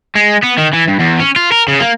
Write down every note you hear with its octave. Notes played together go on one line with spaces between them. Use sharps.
G#3
B3
D#3
E3
G2
E2
C#4
F4
A#4
C#3
A#3